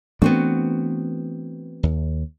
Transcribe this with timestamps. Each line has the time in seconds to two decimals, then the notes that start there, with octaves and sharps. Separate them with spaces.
0.22 E3 A3 B3 C4 D4 F#4
1.83 D#2